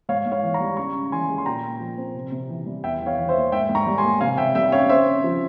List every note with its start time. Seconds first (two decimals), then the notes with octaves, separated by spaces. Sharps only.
0.09 G#2 C#5 F5
0.26 G#2
0.32 C#5 F5
0.43 E3
0.54 A#5 C#6
0.60 G3
0.77 C#3 A#5 C#6
0.94 C#4
1.12 E3 G#5 C6
1.29 G#3
1.38 C6
1.46 A#2 G5 A#5
1.64 A#2
1.80 F3
1.98 C4
2.15 C3
2.32 C3
2.49 E3
2.66 G3
2.83 E2 E5 G5
3.01 E2
3.06 C#5 F5
3.18 E3
3.29 C5 E5
3.35 A#3
3.52 G#2 E5 G5
3.69 G#2
3.75 A#5 C#6
3.87 G3
3.98 G#5 C6
4.04 A#3
4.21 C3 F5 G#5
4.38 C3 E5 G5
4.55 G3 E5 G5
4.72 C#4 C#5 F5
4.89 C#3 C5 E5
5.07 C4
5.24 F3